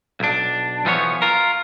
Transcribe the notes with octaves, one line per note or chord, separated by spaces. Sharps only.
B1 D4
B1 E3 F3 B3 C#5
F4 A#4